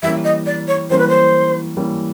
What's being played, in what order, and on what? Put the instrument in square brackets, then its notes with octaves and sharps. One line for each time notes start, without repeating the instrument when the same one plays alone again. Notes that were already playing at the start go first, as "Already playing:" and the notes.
[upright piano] E3 G3 A#3 C#4 [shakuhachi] E5
[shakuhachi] D#5
D5
C#5
[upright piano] E3 G3 A#3 C#4 [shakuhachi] C5
[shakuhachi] B4
C5
[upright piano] E3 G3 A#3 C#4